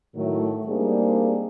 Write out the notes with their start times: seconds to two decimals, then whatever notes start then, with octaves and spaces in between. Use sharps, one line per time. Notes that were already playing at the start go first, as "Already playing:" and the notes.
0.15 A2 D#3 F#3 A3
0.67 G3 A#3 C4 D4 D#4 G#4